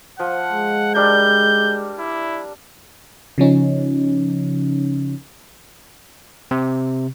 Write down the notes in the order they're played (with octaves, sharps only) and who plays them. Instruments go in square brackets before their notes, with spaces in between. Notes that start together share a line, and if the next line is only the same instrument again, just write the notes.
[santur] F3 [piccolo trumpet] F#5
[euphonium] G#3
[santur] G3 D4 A#4 [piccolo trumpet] G6
[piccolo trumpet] E4
[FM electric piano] C#3 F3 C#4 D#4
[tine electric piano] C3